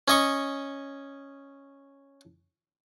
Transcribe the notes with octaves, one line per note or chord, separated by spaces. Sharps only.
C#4 D#5 C#6